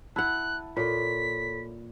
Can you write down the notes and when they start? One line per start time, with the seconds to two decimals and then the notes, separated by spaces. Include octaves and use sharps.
0.16 E4 F#5 A5 F#6
0.77 A#2 A4 C#5 B5 B6